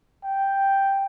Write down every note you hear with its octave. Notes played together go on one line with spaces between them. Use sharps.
G5